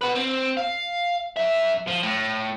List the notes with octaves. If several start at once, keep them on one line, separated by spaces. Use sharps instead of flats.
F#4 B4
C4
F5
F#2 E5
F3
A2